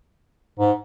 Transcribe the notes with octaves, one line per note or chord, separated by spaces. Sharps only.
G#2